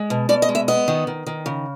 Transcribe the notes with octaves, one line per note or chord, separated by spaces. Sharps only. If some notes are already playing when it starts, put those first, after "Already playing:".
Already playing: G#3
B2
B2 D5
D#5
G#3
E5
B3 D#5
D#3
D#3
D#3
C#3